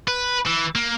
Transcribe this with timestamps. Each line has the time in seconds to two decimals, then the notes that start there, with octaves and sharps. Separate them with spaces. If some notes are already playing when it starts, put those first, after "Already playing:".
0.08 B4
0.46 E3
0.75 A#3